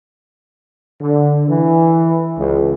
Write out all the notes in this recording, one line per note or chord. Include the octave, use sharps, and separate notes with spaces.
D3
E3
C#2